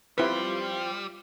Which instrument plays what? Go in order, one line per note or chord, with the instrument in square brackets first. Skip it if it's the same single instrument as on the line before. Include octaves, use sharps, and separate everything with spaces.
[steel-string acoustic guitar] F3 C4 G4 [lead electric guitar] G3 [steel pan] E4 B4 [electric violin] F4 C6